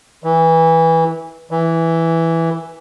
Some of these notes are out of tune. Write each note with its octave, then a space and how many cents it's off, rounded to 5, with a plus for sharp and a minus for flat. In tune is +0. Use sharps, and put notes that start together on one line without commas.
E3 -15
E3 +0